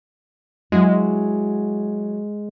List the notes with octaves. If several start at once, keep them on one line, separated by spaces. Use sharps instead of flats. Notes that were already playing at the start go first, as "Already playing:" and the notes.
F#3 G#3 E4 F#4